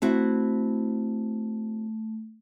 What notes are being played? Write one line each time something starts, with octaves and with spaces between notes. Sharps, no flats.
A3 C4 E4 F#4